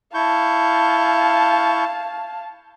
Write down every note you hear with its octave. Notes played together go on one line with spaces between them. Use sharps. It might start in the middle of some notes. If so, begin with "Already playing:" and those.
E4 F5 A5 C#6 G6